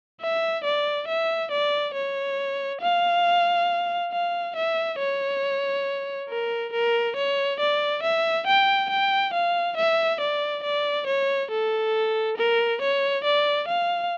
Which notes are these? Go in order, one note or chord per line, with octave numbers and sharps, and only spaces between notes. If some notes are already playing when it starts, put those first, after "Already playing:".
E5
D5
E5
D5
C#5
F5
F5
E5
C#5
A#4
A#4
C#5
D5
E5
G5
G5
F5
E5
D5
D5
C#5
A4
A#4
C#5
D5
F5